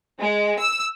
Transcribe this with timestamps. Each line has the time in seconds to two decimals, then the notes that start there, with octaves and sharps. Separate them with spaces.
0.20 G#3
0.58 E6